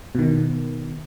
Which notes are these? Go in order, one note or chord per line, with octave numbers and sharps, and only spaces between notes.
B2 D#3